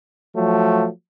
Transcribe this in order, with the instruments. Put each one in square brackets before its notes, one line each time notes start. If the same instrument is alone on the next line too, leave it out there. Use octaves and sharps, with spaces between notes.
[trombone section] F3 F#3 A3